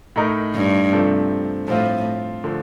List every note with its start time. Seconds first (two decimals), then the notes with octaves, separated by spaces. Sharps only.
0.16 A2 A3 D#4 A#4
0.54 G2
0.92 C3 F3 A3 C4
1.68 A2 F3 C4 F4
2.44 D3 F3 A3